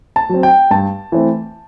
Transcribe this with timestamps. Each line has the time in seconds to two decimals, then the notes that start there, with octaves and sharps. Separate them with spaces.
0.16 A5
0.29 F#3 C4
0.43 G5
0.71 G2 A5
1.12 E3 A3 C4